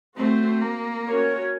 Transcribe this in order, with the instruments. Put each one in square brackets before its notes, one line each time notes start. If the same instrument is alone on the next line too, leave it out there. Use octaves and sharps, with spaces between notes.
[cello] A3 [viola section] C4 F#4 C5
[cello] A#3
[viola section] C#4 F#4 A#4 C#5